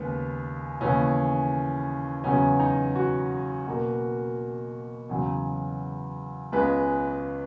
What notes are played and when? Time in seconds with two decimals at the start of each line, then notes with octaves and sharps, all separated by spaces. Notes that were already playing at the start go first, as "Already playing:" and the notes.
Already playing: D#2 C#3 G#3 B3
0.81 D#2 C#3 E3 B3 C#4
2.24 E2 C#3 F#3 B3 C#4
2.60 D#4
2.95 F#4
3.67 B2 A#3
5.09 E2 C#3 F#3
6.52 C#2 C#3 G#3 B3 B4